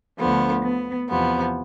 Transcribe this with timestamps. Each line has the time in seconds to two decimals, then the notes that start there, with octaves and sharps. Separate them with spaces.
0.18 D2 D3 F3 B3
0.64 B3
1.08 E2 C3 F3 B3